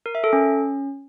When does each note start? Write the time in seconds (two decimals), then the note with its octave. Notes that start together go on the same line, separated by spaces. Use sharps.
0.06 A#4
0.15 E5
0.24 A4
0.33 C#4